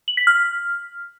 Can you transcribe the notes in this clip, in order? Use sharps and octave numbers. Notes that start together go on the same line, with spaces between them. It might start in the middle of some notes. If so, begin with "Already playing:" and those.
F#7
B6
F6